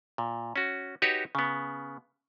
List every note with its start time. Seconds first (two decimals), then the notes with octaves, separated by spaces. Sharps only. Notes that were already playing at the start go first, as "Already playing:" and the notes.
0.18 A#2
0.56 C#4 F#4
1.02 D#4 F#4 G4 B4 C#5
1.35 C#3 B3